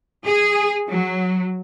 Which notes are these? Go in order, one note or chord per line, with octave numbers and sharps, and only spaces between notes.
G#4
F#3